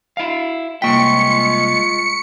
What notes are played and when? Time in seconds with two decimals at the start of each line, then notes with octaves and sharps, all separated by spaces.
0.17 E4 F5
0.82 C2 G#3 A#3 F4 G5 C#6 B6 C#7